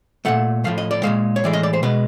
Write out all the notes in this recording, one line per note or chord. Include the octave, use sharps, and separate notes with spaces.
A#2 F3 A3 F#5
A2 F3 A3 F5
D#5
D5
A#2 F3 G#3 F5
C#5
A2 E3 G#3 D5
D#5
D5
C5
B2 G#3 B4